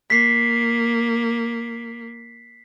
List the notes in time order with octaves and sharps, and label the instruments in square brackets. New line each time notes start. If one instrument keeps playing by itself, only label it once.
[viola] A#3 [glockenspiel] B6 C7